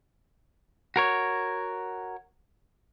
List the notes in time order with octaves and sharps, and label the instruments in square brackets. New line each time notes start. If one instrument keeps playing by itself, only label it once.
[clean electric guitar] F#4 A#4 C#5